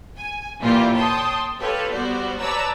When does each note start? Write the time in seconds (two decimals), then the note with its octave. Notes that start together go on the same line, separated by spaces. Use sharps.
0.16 G#5
0.60 A#2 E3 G3 E4 F4 G4
0.94 C#5 G5 A5 C6 D#6
1.60 F4 G4 A4 B4 C#5
1.91 G3 B3 F#4 C5 D5
2.40 B4 C#5 D5 A5 A#5 E6